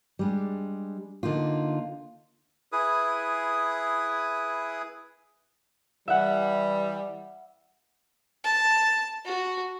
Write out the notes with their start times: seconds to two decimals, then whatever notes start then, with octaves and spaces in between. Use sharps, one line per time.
0.19 G3 G#3 D4
1.23 D3 A#3 D#4 F4
2.72 E4 G#4 B4 D#6
6.08 E3 G3 E5 F#5
8.44 A5
9.25 F#4